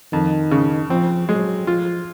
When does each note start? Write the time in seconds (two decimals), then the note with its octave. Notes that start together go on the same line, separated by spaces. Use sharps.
0.12 F2 D#3
0.51 C#3
0.90 F3 C4
1.29 F#3 G#3
1.67 F3 F4